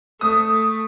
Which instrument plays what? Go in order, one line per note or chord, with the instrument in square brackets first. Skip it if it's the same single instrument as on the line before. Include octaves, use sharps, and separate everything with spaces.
[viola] A3 [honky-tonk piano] D#6